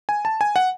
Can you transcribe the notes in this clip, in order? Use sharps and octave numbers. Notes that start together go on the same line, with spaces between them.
G#5
A5
G#5
F#5